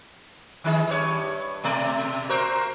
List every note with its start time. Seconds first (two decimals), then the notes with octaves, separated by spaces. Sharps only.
0.64 D#3 D#4 G#4
0.87 G2 C#5
1.64 B2 A3 D5
2.29 F#4 A#4 C5